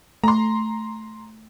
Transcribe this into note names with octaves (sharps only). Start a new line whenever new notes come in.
A3 A#5 C6